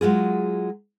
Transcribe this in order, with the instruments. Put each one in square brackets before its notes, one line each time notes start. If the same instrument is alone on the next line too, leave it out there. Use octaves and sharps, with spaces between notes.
[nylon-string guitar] F#3 G#3 F4 G#4